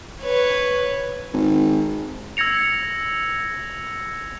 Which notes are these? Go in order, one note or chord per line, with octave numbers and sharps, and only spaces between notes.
B4 C#5
G#1
E6 G#6 A#6 C#7 F7